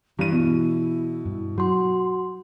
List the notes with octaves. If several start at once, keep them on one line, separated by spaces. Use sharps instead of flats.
G2 E3 E4 D#7
B2
G2
F#3 F#4 C6